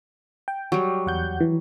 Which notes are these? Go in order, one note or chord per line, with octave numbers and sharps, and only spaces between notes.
G5
F#3 G3 G5
E2 F#5 G6
E3